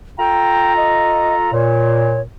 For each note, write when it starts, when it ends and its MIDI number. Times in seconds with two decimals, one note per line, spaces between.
0.19 1.50 65
0.19 1.50 69
0.19 0.76 79
0.19 1.50 82
0.77 1.35 75
1.52 2.23 46
1.52 2.21 73